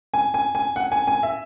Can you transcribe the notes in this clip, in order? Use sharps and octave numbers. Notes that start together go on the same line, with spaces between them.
G#5
G#5
G#5
F#5
G#5
G#5
E5